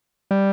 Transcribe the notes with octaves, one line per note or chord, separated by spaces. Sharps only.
G3